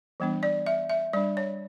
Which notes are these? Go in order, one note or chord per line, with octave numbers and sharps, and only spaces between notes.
E3 G3 B3 D4
D5
E5
E5
G3 D4 D5
C#5